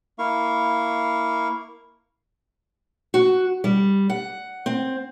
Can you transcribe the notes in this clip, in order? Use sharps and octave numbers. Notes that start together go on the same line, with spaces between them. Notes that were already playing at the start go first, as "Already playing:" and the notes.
A#3 E4 F5 C#6
F#4
G3
F#5
C4